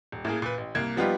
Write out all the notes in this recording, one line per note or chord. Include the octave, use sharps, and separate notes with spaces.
D#1
A2 A#3 G#4
A#2 B4
A1
C2 A#3 G#6
F3 G3 B3 D#4 F4 G4